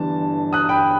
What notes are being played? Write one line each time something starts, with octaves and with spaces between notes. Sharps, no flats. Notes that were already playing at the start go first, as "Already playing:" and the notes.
Already playing: G1 G2 E3 A5
D#6 F#6
G5 B5